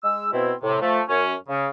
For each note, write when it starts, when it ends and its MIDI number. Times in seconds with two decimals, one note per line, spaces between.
0.03 0.31 56
0.03 0.31 88
0.33 0.53 47
0.33 0.53 60
0.33 0.53 64
0.62 0.81 45
0.62 0.81 48
0.81 1.01 53
0.81 1.01 57
1.09 1.34 42
1.09 1.34 61
1.49 1.67 49